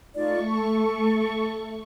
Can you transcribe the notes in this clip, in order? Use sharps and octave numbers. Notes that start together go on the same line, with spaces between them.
A3 D#4 F4 D5 C#6
A4